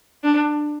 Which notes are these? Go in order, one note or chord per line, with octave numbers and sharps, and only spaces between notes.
D4